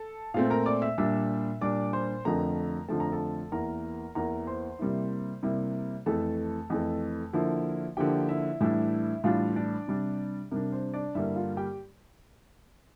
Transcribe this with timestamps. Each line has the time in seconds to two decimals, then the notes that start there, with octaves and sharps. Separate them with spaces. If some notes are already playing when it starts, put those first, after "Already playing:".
Already playing: A4 A5
0.34 A#2 A3 C4 F4 F5
0.50 A#4 A#5
0.66 D5 D6
0.82 E5 E6
0.98 A#2 G3 D4 E5 E6
1.61 A#2 G3 D4 D5 D6
1.93 C5 C6
2.25 F2 D3 F3 A3 A#4 A#5
2.89 F2 D3 F3 A3 A5
3.00 A#5
3.12 A4 A5
3.52 E2 E3 A#3 E4 A#4 A#5
4.15 E2 E3 A#3 E4 A#4 A#5
4.47 C5 C6
4.79 C3 G3 A#3 E4
5.43 C3 G3 A#3 E4
6.06 F2 E3 A3 A4 A5
6.70 F2 E3 A3
7.33 D3 F3 A#3 E4
7.97 D3 F3 A#3 E4 G4 G5
8.29 E4 E5
8.61 A2 E3 G3 D4 E4 E5
9.24 A2 E3 G3 D4 F4 F5
9.56 D4 D5
9.88 C3 G3 D4
10.51 C3 G3 D4 A#4
10.72 C5
10.94 D4 D5
11.15 G2 D3 G3 A#3 E4 E5
11.36 F4 F5
11.57 G4 G5